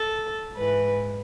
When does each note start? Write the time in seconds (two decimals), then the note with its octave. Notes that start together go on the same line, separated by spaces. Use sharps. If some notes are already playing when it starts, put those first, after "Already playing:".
Already playing: A4
0.56 G#2 E3 B4